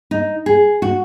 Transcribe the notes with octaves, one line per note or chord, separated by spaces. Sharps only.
D#4
G#4
F#4